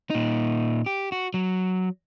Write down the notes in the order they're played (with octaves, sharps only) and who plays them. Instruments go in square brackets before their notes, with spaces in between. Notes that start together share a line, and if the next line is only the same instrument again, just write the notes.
[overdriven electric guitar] A#2 D#4
G4
F#4
F#3